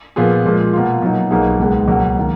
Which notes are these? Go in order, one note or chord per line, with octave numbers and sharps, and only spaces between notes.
A#2 F3 B3 F4 G#4
A#2 F3 G#3
B2 A#3 F4
B2 F#3 A#3 D#4
B1 B2 A#3 D#4 G#4
C#2 B2 G#3 B3
C#2 B2 F#3 A#3
D#3 A#3